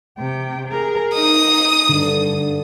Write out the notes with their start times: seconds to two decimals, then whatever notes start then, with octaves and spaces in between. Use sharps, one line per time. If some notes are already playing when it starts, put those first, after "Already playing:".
0.18 C3 G5
0.68 G#4 A#4
1.14 D#4 D#6
1.89 G2 D3